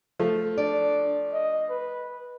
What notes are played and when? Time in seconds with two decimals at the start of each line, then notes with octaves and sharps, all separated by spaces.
0.19 F3 A3
0.58 D4 D5
1.33 D#5
1.70 B4